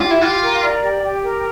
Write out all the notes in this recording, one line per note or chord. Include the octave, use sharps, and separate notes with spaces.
F4 G4
E4
F4 G4
A#4
D5
G4
G4
A#4